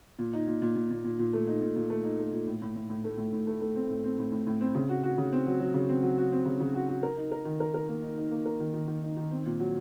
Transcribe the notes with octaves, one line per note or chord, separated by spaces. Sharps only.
A#2
D#4
A#2
A#2
A#2
A#2
A#2
A#2
A3
D#4
A#2
A#2
A3
D#4
A3
A#2
A2
A2
A2
A2
A3
A2
A2
A3
A3
C4
A2
C4
A2
A2
A2
C4
C#3
F#4
F#4
C#3
C4
F#3
F#3
C#3
C4
F#3
F#4
C4
C#3
C#3
F#4
F#4
A#4
D#4
A#4
D#3
A#4
A#4
A#3
D#4
D#4
A#3
A#4
D#3
D#3
D#3
D#4
D#3
C4
A#2
F#3